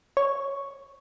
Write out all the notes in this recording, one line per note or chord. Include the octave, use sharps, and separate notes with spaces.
C#5